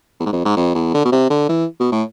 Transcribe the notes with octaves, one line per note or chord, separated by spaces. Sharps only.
E2
G#2
F2
G#2
F2
E2
D3
B2
C3
D3
E3
B2
A2